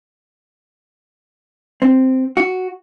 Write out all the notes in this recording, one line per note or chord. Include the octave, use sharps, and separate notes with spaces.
C4
F#4